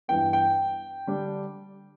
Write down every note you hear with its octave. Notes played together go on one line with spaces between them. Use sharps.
G2 E3 B3 G5
G5
D3 G3 D4